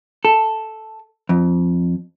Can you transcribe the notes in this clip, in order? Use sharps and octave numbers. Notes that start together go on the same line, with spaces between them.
A4
F2